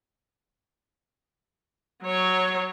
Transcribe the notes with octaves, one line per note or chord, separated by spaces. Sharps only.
F#3 C#5